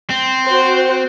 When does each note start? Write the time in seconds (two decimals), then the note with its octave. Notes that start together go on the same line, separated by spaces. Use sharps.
0.10 C4
0.45 F#4 C5